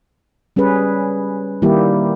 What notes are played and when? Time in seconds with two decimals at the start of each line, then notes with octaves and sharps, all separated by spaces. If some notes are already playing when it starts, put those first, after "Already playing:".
0.56 G3 C#4 G#4 B4
1.62 D#3 G3 A#3 E4 G4